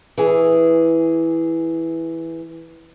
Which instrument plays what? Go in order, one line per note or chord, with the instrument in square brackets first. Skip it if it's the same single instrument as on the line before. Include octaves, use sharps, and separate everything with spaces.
[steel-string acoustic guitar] E3 G#4